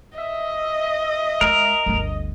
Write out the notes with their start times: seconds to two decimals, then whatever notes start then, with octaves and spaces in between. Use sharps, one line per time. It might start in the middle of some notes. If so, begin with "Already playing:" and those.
0.18 D#5 E5
1.41 G#3 A#4
1.86 G1 D2